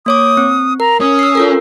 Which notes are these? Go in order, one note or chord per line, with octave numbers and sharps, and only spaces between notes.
A#3 C#5 D6 D#6
C4
A#4 A#5
C#4 D#6
E6 C7
F4 A4 A#4